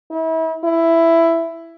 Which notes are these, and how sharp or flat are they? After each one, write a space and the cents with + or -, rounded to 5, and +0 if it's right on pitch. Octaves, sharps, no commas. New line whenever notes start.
E4 -35
E4 +10